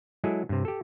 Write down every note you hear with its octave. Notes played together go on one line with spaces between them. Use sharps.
F#3 G#3 E4 G#4 A4
G2 C3
G4 A4